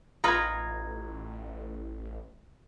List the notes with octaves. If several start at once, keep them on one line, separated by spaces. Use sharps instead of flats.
A1 D#4 F4 B4 A#5 G#6